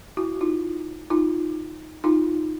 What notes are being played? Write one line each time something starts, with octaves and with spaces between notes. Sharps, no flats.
E4 F#4
D#4 F4
D#4 F4
D#4 F4